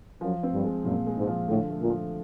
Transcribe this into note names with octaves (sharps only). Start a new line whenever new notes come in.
F#2 F3
C4
G2
G#3
F#2 A#2
G#3
G#2
F3
A2 D3
A3
A#2
F3